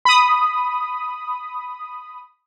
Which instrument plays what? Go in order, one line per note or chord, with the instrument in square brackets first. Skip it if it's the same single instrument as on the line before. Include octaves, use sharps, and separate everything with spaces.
[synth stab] B5 D#6